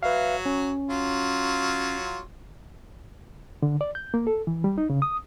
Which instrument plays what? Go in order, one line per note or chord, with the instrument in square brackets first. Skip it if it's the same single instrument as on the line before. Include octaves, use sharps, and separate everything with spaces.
[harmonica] F#3 [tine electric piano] B4 E5 F5
[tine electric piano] C#4
[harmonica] F#3 F4
[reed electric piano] D3
D5
G6
A#3
A4
E3
G3
D#4
C#3
D#6